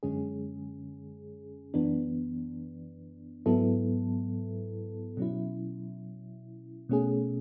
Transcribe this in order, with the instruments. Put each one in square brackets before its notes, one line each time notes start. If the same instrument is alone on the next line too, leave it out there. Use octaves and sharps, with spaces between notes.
[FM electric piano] F#2 D3 G#3 C#4 G#4
F#2 E3 B3 D4
G#2 F#3 B3 E4 A4
B2 F#3 C#4 E4
B2 A3 C#4 G#4